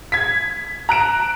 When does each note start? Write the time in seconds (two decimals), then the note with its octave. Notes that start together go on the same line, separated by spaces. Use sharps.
0.12 G#6 B6
0.89 A#5 F#6 D7 E7